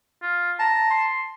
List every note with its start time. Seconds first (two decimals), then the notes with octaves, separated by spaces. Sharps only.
0.22 F4
0.59 A5 A#5
0.90 C6